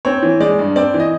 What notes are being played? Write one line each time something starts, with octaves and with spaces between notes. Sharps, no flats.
C4 C#5
E3
G#3 D5
G2
C4 D5
E3
D#5